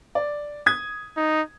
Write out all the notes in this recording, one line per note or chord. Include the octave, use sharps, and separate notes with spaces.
D5
D#6 G#6
D#4